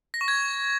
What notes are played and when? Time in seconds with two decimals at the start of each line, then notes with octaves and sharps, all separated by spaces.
0.14 A#6
0.21 C#6
0.28 G#6